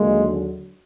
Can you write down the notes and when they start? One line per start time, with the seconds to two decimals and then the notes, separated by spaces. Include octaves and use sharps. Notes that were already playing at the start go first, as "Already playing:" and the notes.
Already playing: D#2 D3 F#3 G#3 A#3